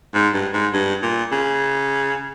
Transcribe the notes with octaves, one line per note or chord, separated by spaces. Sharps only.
G#2
G2
G#2
G2
A#2
C#3